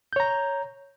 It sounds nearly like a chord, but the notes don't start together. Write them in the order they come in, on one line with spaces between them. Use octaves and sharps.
G6 C#5 A#5